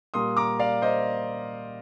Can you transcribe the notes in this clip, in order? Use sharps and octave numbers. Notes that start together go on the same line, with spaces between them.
A#2 G3 A#3 C6 D#6
A#5 D6
D5 F5
C5 D#5